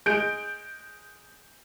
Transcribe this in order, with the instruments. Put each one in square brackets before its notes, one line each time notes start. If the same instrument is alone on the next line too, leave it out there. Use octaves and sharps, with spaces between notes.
[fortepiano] G#3 [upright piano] G6 D7